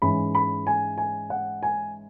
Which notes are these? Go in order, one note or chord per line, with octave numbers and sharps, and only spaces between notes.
G#2 E3 G#3 C#4 B5
B5
G#5
G#5
F#5
G#5